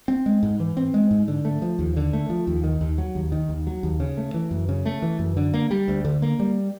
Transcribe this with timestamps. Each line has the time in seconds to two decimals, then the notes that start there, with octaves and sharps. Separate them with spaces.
0.08 C4
0.26 G#3
0.43 G#2
0.60 E3
0.77 C4
0.94 G#3
1.11 G#2
1.28 D3
1.45 A3
1.62 F3
1.79 D#2
1.96 D3
2.13 A3
2.30 F3
2.47 D#2
2.64 D#3
2.81 D#2
2.98 F#3
3.15 D#2
3.32 D#3
3.49 D#2
3.67 F#3
3.83 D#2
4.00 C#3
4.17 A3
4.34 E3
4.51 F#2
4.69 C#3
4.86 A3
5.02 E3
5.19 F#2
5.37 D3
5.54 A#3
5.70 G3
5.88 D2
6.05 D3
6.22 A#3
6.39 G3